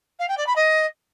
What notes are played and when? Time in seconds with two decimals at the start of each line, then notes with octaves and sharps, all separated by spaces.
0.19 F5
0.28 G5
0.37 D5
0.46 B5
0.56 D#5